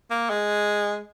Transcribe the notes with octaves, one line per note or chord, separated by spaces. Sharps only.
A#3
G#3